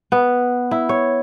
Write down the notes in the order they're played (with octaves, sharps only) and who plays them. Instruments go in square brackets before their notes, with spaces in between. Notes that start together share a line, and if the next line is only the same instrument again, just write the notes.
[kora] B3
E4
C#5